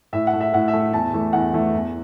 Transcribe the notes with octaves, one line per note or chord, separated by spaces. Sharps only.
A2 E5
F#5
A3
E5
A2 F#5
E5
A3
E2 A5
E3 A3
E2 F#5
E3 A3
E2